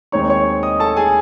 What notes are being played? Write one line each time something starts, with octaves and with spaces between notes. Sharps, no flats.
D#2 D#3 G#3 C4 D#4 C#5 C#6
C#5 C#6
D#5 D#6
A4 A5
G#4 G#5